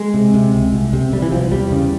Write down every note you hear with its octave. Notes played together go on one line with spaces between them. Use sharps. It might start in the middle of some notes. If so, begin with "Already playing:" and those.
Already playing: G#3
C3
C3
C#2
C2
C3
C3 G3
E3
C2 F3
F3
E2 G3
C#3